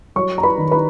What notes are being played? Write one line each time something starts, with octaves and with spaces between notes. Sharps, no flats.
F#3 C#5 C#6
A#5
B4 B5
D#3
B4 B5